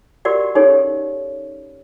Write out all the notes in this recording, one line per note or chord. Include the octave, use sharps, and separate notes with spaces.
F#4 G4 A#4 D5 F#5
C#4 D#4 G4 A4 C#5